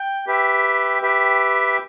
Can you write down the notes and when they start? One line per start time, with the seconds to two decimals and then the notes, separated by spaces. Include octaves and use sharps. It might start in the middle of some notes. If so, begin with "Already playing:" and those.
Already playing: G5
0.26 G4 B4 E5 G5
1.02 G4 B4 E5 G5